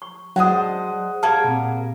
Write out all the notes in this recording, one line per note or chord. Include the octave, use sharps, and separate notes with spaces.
C#6
F#3 G#3 D4 C5 F#5 A5 D#6
G3 A#3 G#4 A5 F6 G#6
A#2 C4